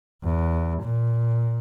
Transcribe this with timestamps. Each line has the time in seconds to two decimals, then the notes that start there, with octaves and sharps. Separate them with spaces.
0.24 E2
0.82 A#2